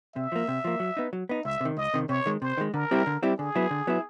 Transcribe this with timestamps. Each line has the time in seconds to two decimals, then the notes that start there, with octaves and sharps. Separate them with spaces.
0.16 C3 E5
0.32 F3 A#3
0.48 C3
0.65 F3 A#3
0.80 F#3
0.97 B3 D#4
1.13 F#3
1.29 B3 D#4
1.45 C#2 E5
1.61 C3 D#3
1.77 C#2 D#5
1.94 C3 D#3
2.09 C3 C#5
2.26 D#3 G#3
2.42 C3 C5
2.58 D#3 G#3
2.74 D3 A#4
2.91 G3 C4 E4 G4
3.07 D3
3.23 G3 C4 E4 G4
3.39 D3 G#4
3.55 F#3 B3 E4
3.71 D3
3.87 F#3 B3 E4